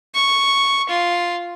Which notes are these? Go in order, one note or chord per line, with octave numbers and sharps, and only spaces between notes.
C#6
F4